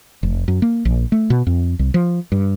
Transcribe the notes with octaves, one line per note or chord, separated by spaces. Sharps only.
F1
F#2
A#3
A#1
A3
B2
F2
C2
F3
G2